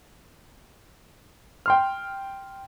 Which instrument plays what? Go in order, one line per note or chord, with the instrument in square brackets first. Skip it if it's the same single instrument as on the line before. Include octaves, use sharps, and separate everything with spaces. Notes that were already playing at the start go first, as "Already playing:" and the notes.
[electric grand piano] G5 C6 F6